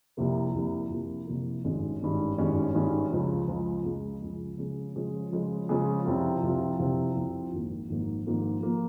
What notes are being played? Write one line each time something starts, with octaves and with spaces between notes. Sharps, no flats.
C2 C3 F3 A#3
C2 C3 F3 A#3
C2 C3 F3 A#3
C2 C3 F3 A#3
G#1 G2 D#3 G#3 C#4
G#1 G2 D#3 G#3 C#4
G#1 G2 D#3 G#3 C#4
G#1 G2 D#3 G#3 C#4
C#2 C#3 F3 G#3
C#2 C#3 F3 G#3
C#2 C#3 F3 G#3
C#2 C#3 F3 G#3
C#3 F3 G#3 C#4 G#4
C#3 F3 G#3 C#4 G#4
C#3 F3 G#3 C#4 G#4
C#3 F3 G#3 C#4 G#4
C2 C3 F3 C4 F4
C2 C3 F3 C4 F4
C2 C3 F3 C4 F4
C2 C3 F3 C4 F4
G#1 G#2 F3 A#3
G#1 G#2 F3 A#3
G#1 G#2 F3 A#3
F3 A#3